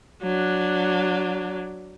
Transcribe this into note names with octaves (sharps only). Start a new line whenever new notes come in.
F#3 D4